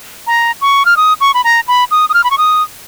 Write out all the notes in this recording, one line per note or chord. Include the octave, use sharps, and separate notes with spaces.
A#5
C#6
F6
D#6
C#6
B5
A#5
B5
D#6
D#6
F6
B5
C#6
D#6